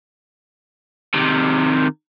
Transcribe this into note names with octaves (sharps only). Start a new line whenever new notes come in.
C3 D#3